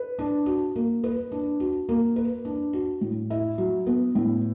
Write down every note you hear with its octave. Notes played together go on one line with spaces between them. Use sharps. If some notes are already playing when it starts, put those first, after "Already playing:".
Already playing: B4
D4
F#4
A#3
B4
D4
F#4
A#3
B4
D4
F#4
A2
E4
F#3
B3
A2